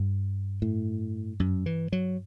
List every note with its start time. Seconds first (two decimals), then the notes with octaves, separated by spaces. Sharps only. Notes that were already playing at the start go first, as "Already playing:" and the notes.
Already playing: G2
0.62 A2
1.40 F#2
1.66 E3
1.92 F#3